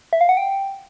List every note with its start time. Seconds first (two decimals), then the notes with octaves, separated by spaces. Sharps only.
0.13 E5
0.21 F5
0.29 F#5
0.37 G5